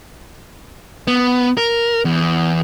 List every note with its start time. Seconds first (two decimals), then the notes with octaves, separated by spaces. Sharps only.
1.07 B3
1.57 A#4
2.05 E2